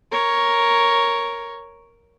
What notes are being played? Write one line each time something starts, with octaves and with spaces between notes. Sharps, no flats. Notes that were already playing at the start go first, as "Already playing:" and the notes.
A#4 C#5